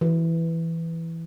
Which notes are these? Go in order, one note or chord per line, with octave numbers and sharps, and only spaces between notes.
E3